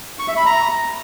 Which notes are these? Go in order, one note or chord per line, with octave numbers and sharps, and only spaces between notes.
C#6
E5
B5
A#5